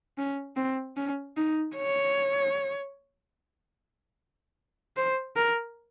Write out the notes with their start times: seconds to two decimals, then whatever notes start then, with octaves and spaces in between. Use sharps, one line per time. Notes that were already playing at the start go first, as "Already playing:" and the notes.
0.18 C#4
0.57 C4
0.97 C#4
1.37 D#4
1.76 C#5
4.97 C5
5.36 A#4